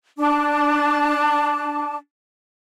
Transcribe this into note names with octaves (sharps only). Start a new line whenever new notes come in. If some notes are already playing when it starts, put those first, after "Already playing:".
D4 A5 D6